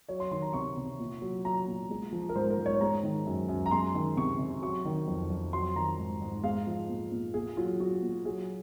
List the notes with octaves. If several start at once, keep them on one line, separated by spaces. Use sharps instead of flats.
F#3 C#5
C6
D#3 C6
A#5
C3 C#6
C3
A#2
F#3
F#3 A#5
A#2
G#3
F3
A#4
G#2 C5
A#4
G#2
C#5
G#3 A#5
D#3
F#2
F#2
A#5
G#3 C6
D#3
C3 C#6
C3
F#3 C#6
D#3
F2
F2
F#3 C6
D#3 A#5
G#2
G#2
G#3 F5
F3
A#2
A#2
A#2 G#4
F#3 F4
F#3 F#4
A#2
F#3 G#4